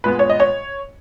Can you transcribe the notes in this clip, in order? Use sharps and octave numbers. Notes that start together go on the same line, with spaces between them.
A#2 G#3 B3 B4
C#5
D#5
C#5